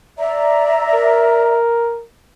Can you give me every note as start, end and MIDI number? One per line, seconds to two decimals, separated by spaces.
0.18 1.56 74
0.18 1.56 76
0.18 1.56 82
0.94 2.04 70